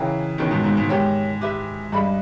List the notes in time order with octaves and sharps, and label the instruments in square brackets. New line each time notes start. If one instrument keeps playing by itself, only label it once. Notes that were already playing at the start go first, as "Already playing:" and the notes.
Already playing: [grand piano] C#3 E3 [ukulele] A#4 D#5 G5 A#5
[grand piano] B2 D#3 [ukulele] C#4 G#4 B4 G5
[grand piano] G#2 B2
G#2
G#2
[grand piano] G#2 [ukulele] G4 A#4 C#5
[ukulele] G4 B4 E5
[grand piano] G2 [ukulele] G#4 D#5 G#5 B5